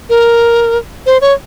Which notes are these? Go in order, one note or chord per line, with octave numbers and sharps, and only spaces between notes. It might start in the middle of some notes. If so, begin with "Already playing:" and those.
A#4
C5
C#5